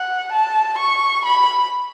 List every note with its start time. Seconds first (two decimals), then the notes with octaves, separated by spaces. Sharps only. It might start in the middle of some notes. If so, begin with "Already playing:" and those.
Already playing: F#5
0.33 A5
0.78 C#6
1.25 B5